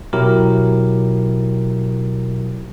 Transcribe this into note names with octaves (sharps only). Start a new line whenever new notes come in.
B2 F#3 E4 G4 A#4